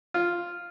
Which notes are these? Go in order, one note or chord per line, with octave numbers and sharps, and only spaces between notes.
F4